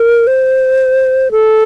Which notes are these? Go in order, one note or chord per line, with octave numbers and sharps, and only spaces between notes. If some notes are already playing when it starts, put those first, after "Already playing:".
Already playing: A#4
C5
A4